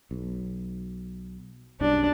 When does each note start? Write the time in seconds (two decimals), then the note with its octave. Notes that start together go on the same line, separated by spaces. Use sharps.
0.11 B1
1.81 B1 F#2 G3 D4